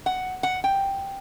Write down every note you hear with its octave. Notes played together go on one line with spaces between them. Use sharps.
F#5
F#5
G5